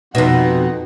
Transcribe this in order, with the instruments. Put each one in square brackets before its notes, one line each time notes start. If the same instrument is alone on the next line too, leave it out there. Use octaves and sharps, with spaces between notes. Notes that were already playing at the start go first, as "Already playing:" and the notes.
[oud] F2 B2 [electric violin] D#4 F#5